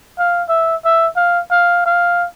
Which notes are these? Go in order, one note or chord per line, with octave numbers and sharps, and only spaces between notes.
F5
E5
E5
F5
F5
F5